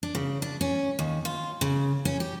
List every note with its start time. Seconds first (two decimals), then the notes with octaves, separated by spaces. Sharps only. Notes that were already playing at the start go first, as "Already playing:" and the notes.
0.03 D4
0.15 C#3
0.42 D4
0.61 C#4
0.99 D#2
1.25 F4
1.61 C#3
2.05 C#4
2.20 G4